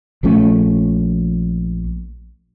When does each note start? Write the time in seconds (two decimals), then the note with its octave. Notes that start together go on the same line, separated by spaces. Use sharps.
0.23 A#1 F3 A3 C#4